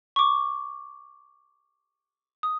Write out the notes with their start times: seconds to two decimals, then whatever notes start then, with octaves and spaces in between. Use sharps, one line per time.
0.16 C#6 D6
2.43 D#6